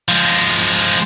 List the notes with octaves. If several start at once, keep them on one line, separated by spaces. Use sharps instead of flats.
F3 G#3